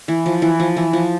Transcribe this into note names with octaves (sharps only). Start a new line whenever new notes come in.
E3
F3
E3
F3
E3
F3